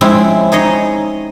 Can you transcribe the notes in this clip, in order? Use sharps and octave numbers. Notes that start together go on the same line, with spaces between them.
F3 G#3 C4 C#4 E4
D#4 G#4 C#5 D#5